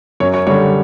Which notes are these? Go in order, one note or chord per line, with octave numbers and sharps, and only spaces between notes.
F#2 C#5
C#5
D3 G3 C#5